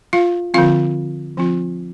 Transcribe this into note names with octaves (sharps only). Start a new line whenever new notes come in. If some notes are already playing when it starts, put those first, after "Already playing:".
F4 F5
D3 F3 C4 F4 F5
F3 C4 F4